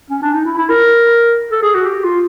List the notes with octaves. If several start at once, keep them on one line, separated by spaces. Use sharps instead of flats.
C#4
D4
D#4
E4
E4
A#4
A4
G#4
F#4
G4
F4